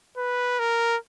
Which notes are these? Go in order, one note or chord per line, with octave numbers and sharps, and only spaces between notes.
B4
A#4